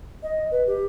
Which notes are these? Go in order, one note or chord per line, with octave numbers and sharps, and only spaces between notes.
D#5
B4
G4